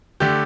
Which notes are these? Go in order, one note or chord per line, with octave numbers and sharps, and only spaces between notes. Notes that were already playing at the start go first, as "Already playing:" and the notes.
D3 A3 G4